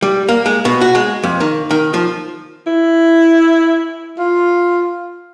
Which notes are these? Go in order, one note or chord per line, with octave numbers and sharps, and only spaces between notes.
G3
A#3
G#3
B2
F#4
G#3
F2
D#3
D#3
F3
E4
F4